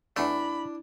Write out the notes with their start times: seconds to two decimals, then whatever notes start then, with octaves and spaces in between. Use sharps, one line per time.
0.16 E2 A3 D4 E4 B5